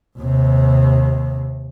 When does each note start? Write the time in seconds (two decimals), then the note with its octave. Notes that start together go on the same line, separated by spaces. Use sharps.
0.18 D#2 C3